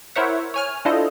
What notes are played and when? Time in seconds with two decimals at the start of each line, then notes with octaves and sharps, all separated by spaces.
0.16 E4 A#4 C5 C#5 E5 F#5
0.54 C#5 G#5 F6
0.85 D4 E4 F4 A4 C5 D#5